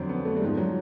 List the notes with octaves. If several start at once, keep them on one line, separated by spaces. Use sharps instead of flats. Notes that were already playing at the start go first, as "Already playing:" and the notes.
Already playing: F2 D3 F#3 C4
B3
A3
G3
G#2 F3 G#3
F#3